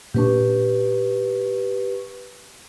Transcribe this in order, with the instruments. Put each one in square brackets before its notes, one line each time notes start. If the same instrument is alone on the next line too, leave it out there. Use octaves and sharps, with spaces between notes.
[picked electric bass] A#2 C4 D4 [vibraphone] G4 B4 C#6